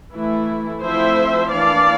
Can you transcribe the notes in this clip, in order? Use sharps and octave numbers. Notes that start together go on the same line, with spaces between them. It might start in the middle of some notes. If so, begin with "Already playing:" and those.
E3 A3 E4
F3 A3 C4 E4 C5 E5
E3 A#3 D4 D5 F5